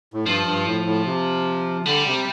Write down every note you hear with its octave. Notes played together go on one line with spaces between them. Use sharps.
A2
G2 F3
G2
A2
A2
C3
D3 G3
C3